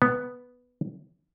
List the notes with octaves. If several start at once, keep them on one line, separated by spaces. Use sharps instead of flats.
B3